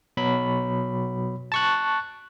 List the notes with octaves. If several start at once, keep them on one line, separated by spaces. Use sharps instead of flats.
B2 F#3 B5
A5 C#6 F#6